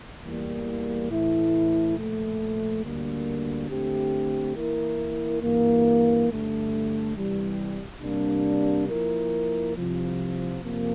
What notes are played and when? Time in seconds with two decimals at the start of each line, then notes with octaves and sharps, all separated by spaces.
0.22 E2 E3 G3 A#3
1.08 A2 E3 A3 E4
1.95 A#2 F3 A3
2.82 D2 D3 G3 A#3
3.68 D3 A3 C4 G4
4.55 E3 A#3 E4 A#4
5.42 G2 E3 A#3
6.28 G2 D3 A3
7.15 C3 E3 G3
8.01 C3 G3 A#3 D4
8.88 F3 A#3 E4 A#4
9.74 C2 C3 F3
10.61 F2 C3 F3 A#3